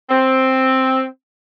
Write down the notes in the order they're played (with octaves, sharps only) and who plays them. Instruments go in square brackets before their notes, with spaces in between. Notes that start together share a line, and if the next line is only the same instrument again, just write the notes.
[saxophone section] C4